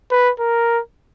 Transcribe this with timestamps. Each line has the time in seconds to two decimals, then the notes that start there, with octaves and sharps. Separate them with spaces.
0.11 B4
0.40 A#4